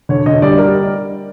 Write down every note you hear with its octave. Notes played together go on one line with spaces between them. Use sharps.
D3 C#5
D3 D#5
G3 D5
G3 A#4